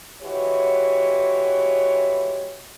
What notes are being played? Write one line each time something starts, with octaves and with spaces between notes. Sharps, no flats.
E3 G#3 F#4 G4 C#5